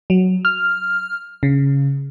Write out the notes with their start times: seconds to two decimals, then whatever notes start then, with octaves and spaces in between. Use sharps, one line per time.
0.10 F#3
0.45 F6
1.43 C#3